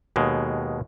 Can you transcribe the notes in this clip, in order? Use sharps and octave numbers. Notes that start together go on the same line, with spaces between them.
D#2 B2 G#3